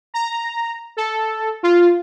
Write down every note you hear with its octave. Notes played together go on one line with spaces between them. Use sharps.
A#5
A4
F4